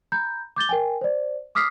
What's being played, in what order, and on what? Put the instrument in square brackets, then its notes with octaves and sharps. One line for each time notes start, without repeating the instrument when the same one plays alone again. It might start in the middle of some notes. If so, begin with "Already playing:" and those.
[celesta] A#5 B5 G6
D6 G6 A6 G7
A#4 G5 G#5
C5 D5
D6 D#6 F6 B6 C7